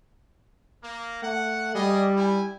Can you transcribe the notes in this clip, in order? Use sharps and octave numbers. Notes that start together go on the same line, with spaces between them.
A#3
A3 F#5
G3 G#4 D5 D#5
E4 G5 G#5